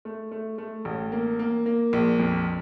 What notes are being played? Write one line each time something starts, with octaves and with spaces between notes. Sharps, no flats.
A3
A3
A3
A1
A#3
A#3
A#3
A#1
F2